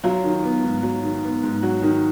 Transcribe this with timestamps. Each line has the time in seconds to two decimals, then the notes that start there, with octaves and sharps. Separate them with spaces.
0.03 F#3 F4
0.24 D#3
0.43 B3
0.63 G#2
0.83 F#3
1.03 D#3
1.23 B3
1.43 G#2
1.62 F#3 F#4
1.82 D#3